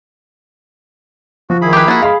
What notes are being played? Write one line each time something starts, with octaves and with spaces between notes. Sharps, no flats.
F3 F#4
D#3 E4 G#4 B5
G4 B4
A#3 F4 F#4
G#3 G#4 F5 B5